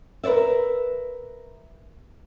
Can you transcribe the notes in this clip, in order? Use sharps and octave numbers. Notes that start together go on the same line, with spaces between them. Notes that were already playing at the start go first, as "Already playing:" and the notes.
A#4 B4 C#5 D5 E5